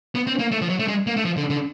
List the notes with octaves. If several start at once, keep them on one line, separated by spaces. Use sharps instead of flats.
B3
C4
A#3
A3
F3
F#3
A3
G#3
A#3
A3
F3
D3
D3